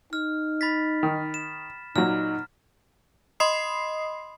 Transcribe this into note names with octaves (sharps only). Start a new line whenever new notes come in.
D#4 F6
B5 A6 B6
D#3
E7
A#2 F#3 D#4 F6
D#5 B5 C6 D#6 C7